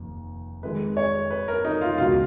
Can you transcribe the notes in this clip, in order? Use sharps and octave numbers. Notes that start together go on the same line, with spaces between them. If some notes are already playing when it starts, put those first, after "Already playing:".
Already playing: F1 D#2
F2 D#3 G#3 B4
C#5
B4
A#4
D#4
F4
C#2 B2 F#3 F4